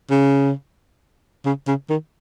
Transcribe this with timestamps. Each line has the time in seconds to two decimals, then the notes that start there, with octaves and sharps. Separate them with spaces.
0.10 C#3
1.46 C#3
1.67 C#3
1.90 D#3